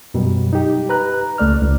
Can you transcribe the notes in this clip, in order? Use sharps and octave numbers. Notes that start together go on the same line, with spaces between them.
F#2 B2 F#3 G3
D#4 G4
B4 A#5 F#6
C#2 A3 D5 F6
C#2